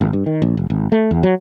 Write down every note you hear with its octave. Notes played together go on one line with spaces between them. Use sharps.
G#1
G2
D#3
A#1
F1
G#1
A3
E2
F#3